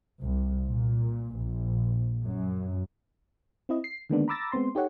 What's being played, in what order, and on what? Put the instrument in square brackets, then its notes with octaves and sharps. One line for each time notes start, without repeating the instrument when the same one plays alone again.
[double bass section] C2
A#2
A#1
F#2
[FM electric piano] C4 E4 D#5
C7
D3 D#3 G#3 A#3 B3 D4
A#5 B5 D6 E6 A6 A#6
G#3 B3 C4 C6
D#4 G4 A4 C#5 F#5